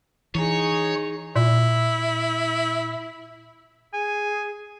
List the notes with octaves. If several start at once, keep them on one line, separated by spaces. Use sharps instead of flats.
E3 D#4 G#4 C#5
A#2 E4
G#4 G#5